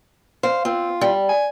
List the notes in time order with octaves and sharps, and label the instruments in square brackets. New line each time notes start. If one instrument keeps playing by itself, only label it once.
[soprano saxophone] C5 [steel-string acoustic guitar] F5
[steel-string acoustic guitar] C4 [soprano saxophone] F4
[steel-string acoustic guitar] G3
[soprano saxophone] G#5